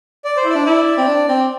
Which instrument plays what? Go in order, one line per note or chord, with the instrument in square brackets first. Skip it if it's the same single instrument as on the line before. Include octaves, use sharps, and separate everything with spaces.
[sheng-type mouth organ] D5
C5
[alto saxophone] E4 [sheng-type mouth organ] D5
[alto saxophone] D4
E4
C4
D4
C4